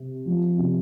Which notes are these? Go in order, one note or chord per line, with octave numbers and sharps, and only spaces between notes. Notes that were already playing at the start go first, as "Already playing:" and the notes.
Already playing: C3
F3
C3